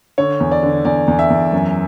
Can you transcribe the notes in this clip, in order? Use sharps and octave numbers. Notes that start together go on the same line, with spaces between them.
D3 C#5
E2
D5
D3
E2 D5
E2
E5
E2
F#2